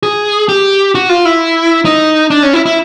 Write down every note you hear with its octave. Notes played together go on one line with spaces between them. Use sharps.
G#4
G4
F#4
F4
E4
D#4
D4
C#4
E4
E4